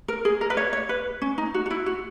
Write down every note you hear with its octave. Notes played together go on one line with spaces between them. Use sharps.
A#4
G#4
A#4
B4
C#5
C#5
B4
C#4
D#4
F#4
F#4
E4
F#4